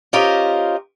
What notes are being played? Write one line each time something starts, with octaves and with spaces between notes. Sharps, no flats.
C#4 F4 G4 A#4 C5 D#5